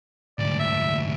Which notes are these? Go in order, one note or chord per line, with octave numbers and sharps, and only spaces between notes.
D2 G#2 D5
E5